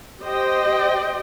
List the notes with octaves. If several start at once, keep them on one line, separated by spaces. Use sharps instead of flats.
G4 C5 D#5 G5